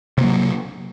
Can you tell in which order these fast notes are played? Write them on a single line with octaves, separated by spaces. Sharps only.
C3 A#3 F#3